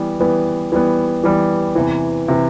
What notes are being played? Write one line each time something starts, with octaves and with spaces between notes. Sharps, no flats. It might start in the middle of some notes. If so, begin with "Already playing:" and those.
Already playing: E3 G3 B3
E3 G3 B3
E3 G3 B3
E3 G3 B3
E2 C3 E3
C3 E3